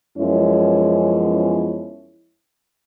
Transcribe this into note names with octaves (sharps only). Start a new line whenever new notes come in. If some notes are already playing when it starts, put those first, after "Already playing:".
F#2 F3 G#3 B3 C#4 E4